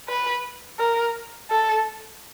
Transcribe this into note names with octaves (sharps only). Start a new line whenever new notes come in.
B4
A#4
A4